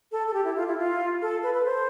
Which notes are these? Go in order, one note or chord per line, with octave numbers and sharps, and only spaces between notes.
A4
A4
G4
E4
F4
E4
F4
A4
B4
B4
C5